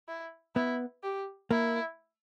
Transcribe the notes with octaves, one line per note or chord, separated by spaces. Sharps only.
E4
B3 E4
G4
A#3 E4